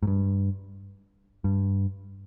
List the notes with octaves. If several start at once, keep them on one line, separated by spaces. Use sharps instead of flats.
G#2
G2
G2